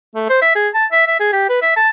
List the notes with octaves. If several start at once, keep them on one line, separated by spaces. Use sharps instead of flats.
A3
C5
E5
G#4
A5
E5
E5
G#4
G4
B4
E5
A5